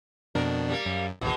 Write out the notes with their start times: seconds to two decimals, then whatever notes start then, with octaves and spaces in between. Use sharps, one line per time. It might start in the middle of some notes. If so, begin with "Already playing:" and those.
0.35 F2 B2 D4 A#4
0.69 G3 A#3
0.86 F#2
1.21 A1 D#2 B2 G#3